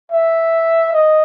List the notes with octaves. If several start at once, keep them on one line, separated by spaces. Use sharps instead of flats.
E5
D#5